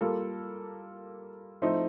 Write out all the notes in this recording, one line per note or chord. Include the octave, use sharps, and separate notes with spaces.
G3 A#3 F4 A4
F3 A3 C4 D#4